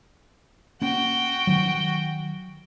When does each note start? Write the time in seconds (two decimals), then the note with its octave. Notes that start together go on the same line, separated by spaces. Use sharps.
0.82 A#3 C#4 F#4 G5
1.47 D#3 F#3